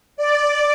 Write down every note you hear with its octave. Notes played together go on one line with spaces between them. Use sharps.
D5